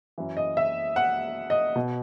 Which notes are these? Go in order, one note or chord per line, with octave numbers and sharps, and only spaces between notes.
F#2 E3
D#5
E5
F#5
D#5
B2